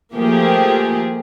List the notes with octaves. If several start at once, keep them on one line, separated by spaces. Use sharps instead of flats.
F3 A3 A#3 G4 G#4